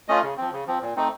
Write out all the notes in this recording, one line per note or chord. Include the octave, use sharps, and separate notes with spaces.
A3 C#4 F4 D#5
C#3
F3 C4
C#3
F3 C4
A#2
A3 C4 D#4